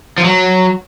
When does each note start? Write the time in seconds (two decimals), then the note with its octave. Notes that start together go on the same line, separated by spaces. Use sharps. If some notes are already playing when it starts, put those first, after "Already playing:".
0.18 F3
0.24 F#3